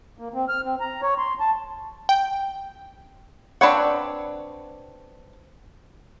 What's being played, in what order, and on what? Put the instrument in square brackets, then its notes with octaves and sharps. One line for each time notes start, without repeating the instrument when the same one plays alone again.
[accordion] A#3
C4
F6
C4
A#5
C#5
C6
A5
[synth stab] G5
[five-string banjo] C4 D4 B4 C#5 F#5